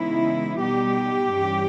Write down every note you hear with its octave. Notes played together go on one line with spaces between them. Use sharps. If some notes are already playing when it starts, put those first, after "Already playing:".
Already playing: C#3 E3 G#3 B3 D#4 E4
B2 G3 B3 D#4 G4
G2 E3 G3 C#4